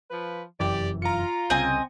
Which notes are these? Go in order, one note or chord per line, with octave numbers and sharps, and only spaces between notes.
F3 B4
F1 F#2 E3 G4 D5
F4 A#5 C#7
C2 C#3 C4 D#5 G#5